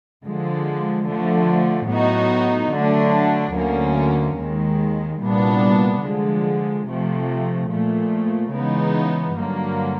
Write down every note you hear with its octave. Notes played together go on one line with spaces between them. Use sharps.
D3 F3 G#3
D3 F3 A3
A2 F#3 B3 D#4 F#4
D3 F#3 A3 D4
D2 D3 F#3 A#3 C#4
D#2 D#3 G#3
C2 A#2 G3 B3 D4
D3 F3 G#3
C3 F3 A3
A#2 F3 A3
C#3 E3 G#3 B3 D#4
G2 D3 F#3 A#3